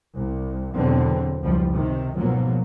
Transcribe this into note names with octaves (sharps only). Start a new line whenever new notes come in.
C2
E2 B2 D3 F#3 C4
F#1 C#2 F3 G3
C3 D#3
G#2 B2 F3 F#3 A#3